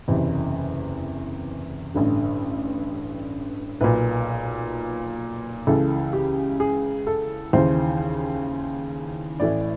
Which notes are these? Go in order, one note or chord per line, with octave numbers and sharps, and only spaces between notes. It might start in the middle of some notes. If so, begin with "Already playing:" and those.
F#1 E2 C3
A1 G2 D3
B1 A#2 B4
C#2 C#3 E3 A4
G4
G#4
A4
D#2 C#3 E3 C5
A1 A2 E3 D5